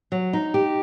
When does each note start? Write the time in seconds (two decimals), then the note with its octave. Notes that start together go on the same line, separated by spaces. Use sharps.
0.12 F#3
0.33 D#4
0.54 G4